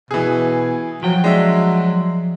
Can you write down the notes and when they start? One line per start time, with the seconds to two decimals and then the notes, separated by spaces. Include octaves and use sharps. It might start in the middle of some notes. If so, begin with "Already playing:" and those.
0.11 B2 E3 G#4
1.03 F3 F#3 G5
1.24 G#3 D4 E5